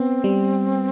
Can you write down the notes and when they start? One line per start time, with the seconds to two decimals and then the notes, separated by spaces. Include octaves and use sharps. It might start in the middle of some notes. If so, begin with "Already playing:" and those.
Already playing: B3 C4
0.24 G3